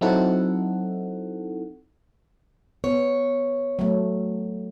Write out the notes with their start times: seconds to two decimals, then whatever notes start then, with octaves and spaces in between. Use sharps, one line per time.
0.01 F#3 C4 D#4 E4 A4 F#5
2.84 B3 C#5
3.79 F#3 A3